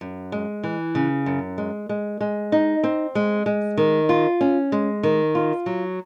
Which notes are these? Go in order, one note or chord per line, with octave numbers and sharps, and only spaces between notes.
F#2
G#3
E3
C#3
F#2
G#3
G#3
G#3
D#4
C4
G#3
G#3
D#3
F4
C#4
G#3
D#3
F4
F#3